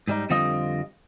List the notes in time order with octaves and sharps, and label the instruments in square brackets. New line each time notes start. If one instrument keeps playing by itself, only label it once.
[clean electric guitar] G#2 G3 D#4
F2 D3 G3 C4 F4 D#5